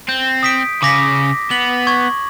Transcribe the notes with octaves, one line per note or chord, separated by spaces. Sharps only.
C4 G6
D#6 B6 D7
C#3 D6 A#6 B6
B3 F#7
C#6 G#6